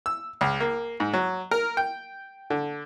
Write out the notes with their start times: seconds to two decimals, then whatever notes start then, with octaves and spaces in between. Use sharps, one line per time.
0.06 E6
0.41 C#2
0.60 A#3
1.00 G#2
1.13 F#3
1.51 A#4
1.77 G5
2.50 D3